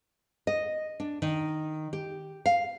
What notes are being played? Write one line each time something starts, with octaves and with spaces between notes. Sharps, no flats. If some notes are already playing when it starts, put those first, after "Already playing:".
D#5
D4
D#3
G4
F5